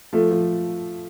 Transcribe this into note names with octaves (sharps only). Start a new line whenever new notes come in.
F3 A3
F3